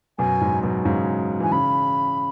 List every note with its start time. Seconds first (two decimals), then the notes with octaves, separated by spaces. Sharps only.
0.19 F#2 B2 G#5
0.41 G#2
0.63 F#2 B2
0.85 G#2 C#3
1.40 E3 G#5
1.52 C#3 B5